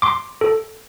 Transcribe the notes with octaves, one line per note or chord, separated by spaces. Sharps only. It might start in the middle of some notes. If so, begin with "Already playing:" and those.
C6 D6
A4